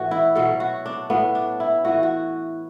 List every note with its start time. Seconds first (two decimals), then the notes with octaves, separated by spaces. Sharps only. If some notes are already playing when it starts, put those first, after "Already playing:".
Already playing: A2 E3 F#4
0.11 E4
0.35 B2 F#3 A4
0.60 F#4
0.86 D4
1.10 A2 F#3 B3
1.35 D4
1.60 E4
1.85 A2 E3 F#4
2.03 F#4